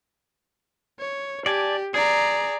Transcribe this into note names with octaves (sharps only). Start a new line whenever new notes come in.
C#5
G4 D5 G#5 A5
G#4 D5 A#5